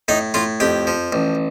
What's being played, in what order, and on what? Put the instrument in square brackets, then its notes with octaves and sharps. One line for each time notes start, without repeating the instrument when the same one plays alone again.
[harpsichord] A2 D#4
A2 F4
F2 G4
F3
A1